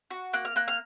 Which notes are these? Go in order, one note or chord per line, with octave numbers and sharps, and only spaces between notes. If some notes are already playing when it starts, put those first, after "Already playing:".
F#4
A#3 F#6
F6
A#3 F#6
F6